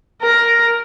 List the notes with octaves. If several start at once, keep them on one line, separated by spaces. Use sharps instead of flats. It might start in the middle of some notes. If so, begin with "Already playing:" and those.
A#4